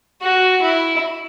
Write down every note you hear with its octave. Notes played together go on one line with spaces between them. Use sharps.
F#4
E4